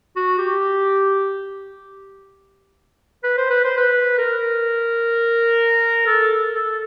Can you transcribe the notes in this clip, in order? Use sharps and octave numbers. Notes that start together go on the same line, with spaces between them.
F#4
G4
B4
C5
B4
C5
B4
A#4
A4
A4